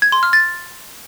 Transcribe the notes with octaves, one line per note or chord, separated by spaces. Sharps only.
G#6
C6
F6
A6